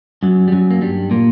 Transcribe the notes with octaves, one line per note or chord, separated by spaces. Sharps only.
F#2 F#3
G3
F#2 F#3
A#3
G2 G3
A#2 A#3